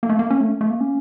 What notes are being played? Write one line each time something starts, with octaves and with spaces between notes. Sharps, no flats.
A#3
A3
A#3
C#4
A3
A3
A#3
C#4